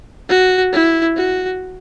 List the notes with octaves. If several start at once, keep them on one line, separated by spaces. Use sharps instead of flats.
F#4
E4
F#4